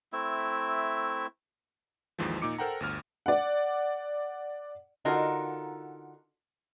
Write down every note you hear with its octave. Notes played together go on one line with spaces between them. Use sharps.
A3 C4 E4 E5
G#1 D#2 G#2 E3 F3
A#2 D#4 D6 C#7
A4 A#4 C5 F#5 G5 A#5
G1 D2 F6
D5 F#5
D3 D#4 F4 F#4 A4 A#4